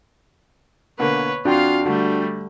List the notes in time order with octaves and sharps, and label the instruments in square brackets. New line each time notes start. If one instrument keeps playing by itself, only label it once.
[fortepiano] B2 D3 A#3 [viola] B4 C#5
[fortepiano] F2 [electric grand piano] D4 F#4 G5 [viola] F4 F5
[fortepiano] D3 [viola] G3 A3